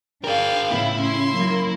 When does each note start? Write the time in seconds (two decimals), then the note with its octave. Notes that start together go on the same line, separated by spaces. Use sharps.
0.24 D4 G#4 A#4 F5 G5
0.71 A2 C#3 B3 E4
1.01 C#4 C6
1.34 F#3 A#3